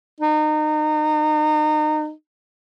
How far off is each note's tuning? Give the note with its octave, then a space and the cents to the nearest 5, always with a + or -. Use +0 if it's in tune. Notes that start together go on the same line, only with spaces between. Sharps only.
D#4 -30